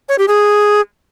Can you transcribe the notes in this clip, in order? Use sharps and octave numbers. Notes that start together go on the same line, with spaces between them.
C#5
G4
G#4